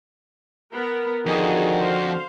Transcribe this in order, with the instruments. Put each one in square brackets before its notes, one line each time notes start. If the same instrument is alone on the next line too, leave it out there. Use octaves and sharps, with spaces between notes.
[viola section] B3 A#4
[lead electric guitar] F2 [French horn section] D3 F#4 [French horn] D#3 [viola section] G#4
[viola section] C5 F5